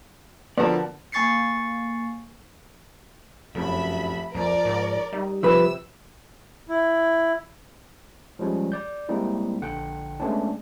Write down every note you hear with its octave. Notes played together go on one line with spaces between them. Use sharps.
D3 F3 B3 A#4 D5 F#5 A5
A#3 G#5 C#6 A6 C7 C#7
F1 F#2 E5 B5
F2 F3 A#4 D5
G#2
G3 D#4
C3 F3 B4 E6
E4
F3 G3 G#3 C#4
D5 G6
G3 G#3 A#3 C4 D#4 E4
A#1 D3 F#5 G5
G#3 A3 B3 C#4 D4